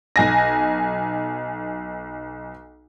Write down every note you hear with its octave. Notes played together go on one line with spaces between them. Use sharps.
B1 G#5 A#6